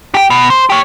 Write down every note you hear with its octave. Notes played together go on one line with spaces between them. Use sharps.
G4 G5
B2
C5
G4 C#5